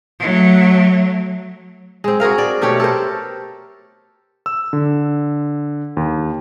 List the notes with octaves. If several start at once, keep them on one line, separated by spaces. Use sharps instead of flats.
F#3 A3
G#3 C4
F#4 G#4 A#4 F5
D5
B2 A3 G4 C#5
A4 A#4 C5
E6
D3
D#2